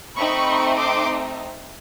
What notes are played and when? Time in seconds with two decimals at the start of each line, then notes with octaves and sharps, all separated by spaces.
0.16 A3 C4 D#4 B5 C#6
0.78 C6 D6